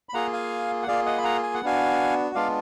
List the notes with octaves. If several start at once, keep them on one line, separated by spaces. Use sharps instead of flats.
B5
A#3 F4 G#4 F#5 A#5
F5 G#5
F#5
A#3 F4 G#4 D5 F5
D#5 F#5
B5
F#5 A#5
G#5
F#5
B3 D4 F#4 F5 G#5
G#3 B3 D4 F4 D5 F5